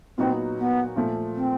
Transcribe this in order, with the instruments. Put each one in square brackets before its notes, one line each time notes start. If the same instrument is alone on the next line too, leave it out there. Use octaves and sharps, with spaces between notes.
[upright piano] A#2 F#3 B3 D#4 F#4 [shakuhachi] C4
[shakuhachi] B3
[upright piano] A#2 F3 A3
[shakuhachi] C4